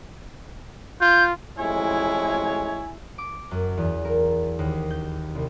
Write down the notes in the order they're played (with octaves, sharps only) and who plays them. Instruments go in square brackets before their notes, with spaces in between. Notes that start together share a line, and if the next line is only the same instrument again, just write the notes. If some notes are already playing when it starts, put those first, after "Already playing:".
[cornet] F4 [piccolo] G6
[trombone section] A1 F2 G#3 [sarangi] E4 [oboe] C#5 [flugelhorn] G#5
[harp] D6
F#2
E2
A#4
D#2
G6
C2